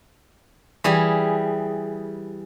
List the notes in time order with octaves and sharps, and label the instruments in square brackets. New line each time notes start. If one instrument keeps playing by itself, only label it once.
[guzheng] E3 G3 G#4